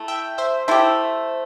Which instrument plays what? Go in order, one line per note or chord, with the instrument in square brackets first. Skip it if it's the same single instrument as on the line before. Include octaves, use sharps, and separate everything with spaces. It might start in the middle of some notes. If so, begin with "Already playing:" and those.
Already playing: [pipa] A3 E4
[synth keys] E5 G5
C5 E5
[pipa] A3 E4 G4 [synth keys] C5 E5